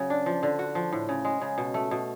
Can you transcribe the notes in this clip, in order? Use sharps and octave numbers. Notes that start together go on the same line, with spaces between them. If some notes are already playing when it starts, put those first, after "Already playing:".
Already playing: C#3 F#3
D4
F3
D3
F#4
F3
A2
C#3
G#3
C#3
B2
A3
B2